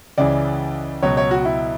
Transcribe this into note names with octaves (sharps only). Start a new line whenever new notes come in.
C#2 C#3 E3 D5
C#2 B2 F#3 C#5
C#5
F#4
E4